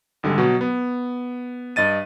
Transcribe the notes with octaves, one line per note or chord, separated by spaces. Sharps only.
G#1 D3 G3 G#3
B2 F#3
B3
G2 D#5 A6 D#7